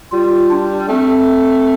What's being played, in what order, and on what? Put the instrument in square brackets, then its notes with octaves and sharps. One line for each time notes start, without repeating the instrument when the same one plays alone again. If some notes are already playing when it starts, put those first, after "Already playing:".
[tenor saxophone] G3 [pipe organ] F4
[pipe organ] D4
[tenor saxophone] A3 [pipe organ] C4